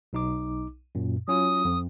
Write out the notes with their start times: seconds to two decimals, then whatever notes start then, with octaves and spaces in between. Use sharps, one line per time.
0.13 B1 D#4 D6
0.95 F#2 A#2
1.28 F#3 C#4 F4 D#6
1.65 F2